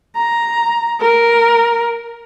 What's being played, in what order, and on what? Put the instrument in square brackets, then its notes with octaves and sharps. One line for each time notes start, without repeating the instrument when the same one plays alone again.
[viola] A#5
A#4